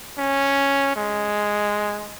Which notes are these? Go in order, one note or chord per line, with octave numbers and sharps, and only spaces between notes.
C#4
G#3